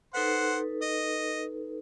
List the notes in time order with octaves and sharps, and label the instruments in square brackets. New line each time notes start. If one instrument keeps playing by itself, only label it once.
[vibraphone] D#4 A4 B4 [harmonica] C5 F#5
[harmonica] D#5